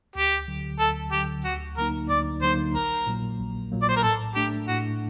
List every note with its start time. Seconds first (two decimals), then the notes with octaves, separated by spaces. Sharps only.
0.15 D2 G4
0.48 D3 F#3
0.80 D2 A4
1.12 D3 F#3 G4
1.44 D2 F#4
1.77 D3 F#3 A#3 D#4 A#4
2.10 D2 D5
2.42 D3 F#3 A#3 D#4 C5
2.74 A#1 A#4
3.07 A#2 F#3 A#3
3.39 A#1
3.72 A#2 F#3 A#3
3.82 D5
3.89 C5
3.96 A#4
4.03 A2 A4
4.35 A3 D4 G4
4.68 A2 F#4